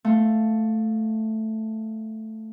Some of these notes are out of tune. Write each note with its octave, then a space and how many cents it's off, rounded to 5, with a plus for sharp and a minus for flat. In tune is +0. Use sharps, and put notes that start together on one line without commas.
A3 +0 F5 +0